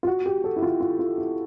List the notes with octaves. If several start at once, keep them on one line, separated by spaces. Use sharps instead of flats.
F4
F#4
G4
A4
E4
F4
F4
F4
E4